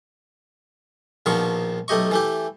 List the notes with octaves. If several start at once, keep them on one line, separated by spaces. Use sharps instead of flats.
A#1 B2 D#3 F3 C#6
B1 A3 G4 D#5 C#6
E3 A3 G4